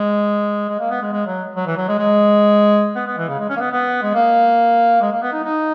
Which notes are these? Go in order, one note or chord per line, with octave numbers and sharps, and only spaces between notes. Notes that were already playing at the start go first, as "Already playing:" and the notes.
Already playing: G#3
G#3
A#3
B3
G#3
G#3
F#3
F#3
E3
F#3
G#3
G#3
B3
B3
E3
C#3
G#3
C#4
A#3
B3
B3
G#3
A#3
G#3
A#3
B3
D#4
D#4